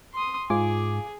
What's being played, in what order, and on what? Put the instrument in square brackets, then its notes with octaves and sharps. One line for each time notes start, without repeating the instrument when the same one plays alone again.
[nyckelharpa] C6 D#6
[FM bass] G#2 [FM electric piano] F4 G#5 D6 [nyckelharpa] G#4